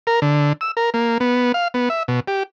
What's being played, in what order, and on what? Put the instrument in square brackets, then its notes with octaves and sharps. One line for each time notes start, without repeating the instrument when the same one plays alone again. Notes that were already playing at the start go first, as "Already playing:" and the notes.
[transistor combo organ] A#4
D3
E6
A#4
A#3
B3
F5
B3
E5
B2
G4